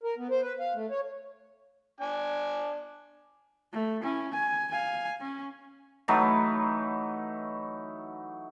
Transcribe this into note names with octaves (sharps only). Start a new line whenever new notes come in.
A#4
B3
C5
B4
F5
A3
C#5
D4 G#5
A3
C#4 E4
G#5
F5 G#5
C#4
E3 F#3 A3 D#4